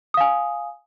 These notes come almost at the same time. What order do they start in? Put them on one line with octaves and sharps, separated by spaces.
D#6 F5 G#5